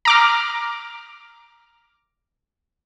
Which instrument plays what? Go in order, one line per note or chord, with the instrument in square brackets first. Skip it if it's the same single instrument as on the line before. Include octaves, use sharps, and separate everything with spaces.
[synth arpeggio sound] A#5 D6 F6